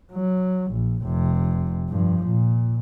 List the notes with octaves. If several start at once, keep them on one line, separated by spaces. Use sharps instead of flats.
F#3
A#1
F1 C3
G2 F3
A#2